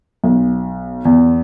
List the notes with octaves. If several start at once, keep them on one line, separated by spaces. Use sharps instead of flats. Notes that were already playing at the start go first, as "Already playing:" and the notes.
B1
E2